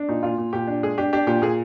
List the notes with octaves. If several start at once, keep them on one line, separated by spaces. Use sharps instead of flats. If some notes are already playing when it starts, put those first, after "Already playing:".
Already playing: D4
A#2 D#4
A#2 F4
A#2
A#2 G4
D4
G#3 G#4
D4 G4
D4 G4
A#2 G4
A#2 G#4